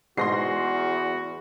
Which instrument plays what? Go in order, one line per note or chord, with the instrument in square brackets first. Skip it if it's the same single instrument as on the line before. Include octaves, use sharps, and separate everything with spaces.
[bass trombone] E2 [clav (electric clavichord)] G#2 B2 [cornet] F#4 [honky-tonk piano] C6 A#6 C7